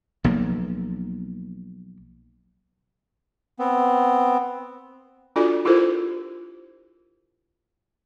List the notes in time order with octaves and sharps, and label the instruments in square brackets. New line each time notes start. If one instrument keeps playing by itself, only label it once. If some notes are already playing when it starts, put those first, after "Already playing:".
[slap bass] B1 F3 A#3
[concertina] B3 C4
[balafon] D4 F4 F#4 A4 D5 G#5
E4 F4 G4 A4 A#4 C5